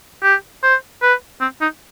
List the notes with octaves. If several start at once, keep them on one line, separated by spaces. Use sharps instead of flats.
G4
C5
B4
C4
D#4